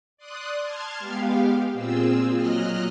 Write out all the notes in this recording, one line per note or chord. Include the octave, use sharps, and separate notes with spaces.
D5 C6 D#6 F#6
A5 C6 F6 G#6
G#3 B3 G4 F5
A#2 C4 F4 G#4 E6
A#2 F#3 D#5 F6 F#6